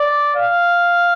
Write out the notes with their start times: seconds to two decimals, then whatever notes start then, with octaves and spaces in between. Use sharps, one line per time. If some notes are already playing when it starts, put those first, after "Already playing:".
Already playing: D5
0.35 F5